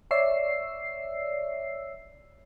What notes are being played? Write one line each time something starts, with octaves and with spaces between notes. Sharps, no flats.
C#5 D5 E5 E6 C7